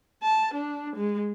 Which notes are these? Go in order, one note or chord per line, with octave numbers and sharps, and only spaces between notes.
A5
D4
G#3